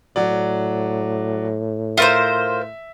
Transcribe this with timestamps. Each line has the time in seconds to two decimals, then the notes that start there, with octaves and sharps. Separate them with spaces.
0.16 A2 F#3 D5
1.97 F4 A#4 C5 E5